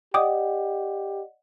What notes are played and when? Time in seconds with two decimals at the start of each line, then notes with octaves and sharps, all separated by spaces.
0.14 G4 D5 D#5 F#5 G5 D6 D#6